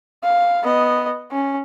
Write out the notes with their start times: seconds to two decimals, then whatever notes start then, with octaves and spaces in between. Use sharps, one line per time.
0.23 F5
0.63 B3 D#5
1.31 C#4